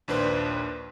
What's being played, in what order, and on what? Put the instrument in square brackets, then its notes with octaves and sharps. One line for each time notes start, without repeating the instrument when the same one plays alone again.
[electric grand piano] A#1 D#2 D4 B4 C5